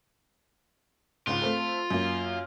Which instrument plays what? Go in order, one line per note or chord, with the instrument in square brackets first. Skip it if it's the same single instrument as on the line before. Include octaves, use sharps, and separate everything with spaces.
[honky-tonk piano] C#2 G#2 [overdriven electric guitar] F4
[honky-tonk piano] A3 C4 A4
F#2 A#3